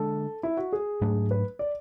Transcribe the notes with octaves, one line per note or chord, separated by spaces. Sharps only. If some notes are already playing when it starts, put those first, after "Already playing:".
Already playing: D3 G#3 D4 A4
E4
F#4
G#4
G#2 F#3 A3 D4
B4
D5